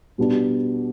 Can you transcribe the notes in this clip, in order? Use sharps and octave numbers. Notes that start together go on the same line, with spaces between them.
B2 G3 B3 D4